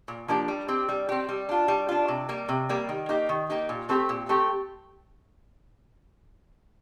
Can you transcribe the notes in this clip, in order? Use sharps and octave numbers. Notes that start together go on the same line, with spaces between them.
A#2
F3 A#3 D4 G4
G3
C4 G4
G3
C4 G4
G3
D4 F4
G3
D4 F4
C3
G3 A#3
C3
G3 A#3
D#3
A#3 D#4 G4
D#3
A#3 D#4 G4
A#2
A3 C4 G4
A#2
A3 C4 G4